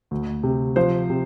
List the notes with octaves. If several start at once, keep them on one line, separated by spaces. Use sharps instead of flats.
D2
C3
F3 C5
C3